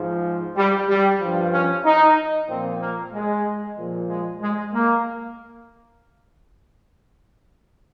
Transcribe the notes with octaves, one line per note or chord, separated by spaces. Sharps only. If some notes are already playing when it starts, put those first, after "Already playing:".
Already playing: G#2 F3
G3
G3
G2 F3
C#4
D#4
A#2 F3 C4
A#3
G#3
A#2 F3
G#3
G#3
A#3